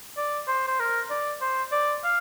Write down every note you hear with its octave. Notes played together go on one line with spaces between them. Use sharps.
D5
C5
C5
A#4
D5
C5
D5
F5